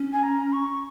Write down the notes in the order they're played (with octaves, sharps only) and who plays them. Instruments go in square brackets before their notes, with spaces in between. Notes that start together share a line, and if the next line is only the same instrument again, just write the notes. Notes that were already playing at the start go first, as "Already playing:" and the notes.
Already playing: [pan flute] C#4
[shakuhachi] G#5
A#5
C#6